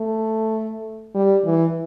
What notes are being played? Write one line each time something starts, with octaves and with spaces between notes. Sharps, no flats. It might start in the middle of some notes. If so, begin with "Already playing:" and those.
Already playing: A3
G3
E3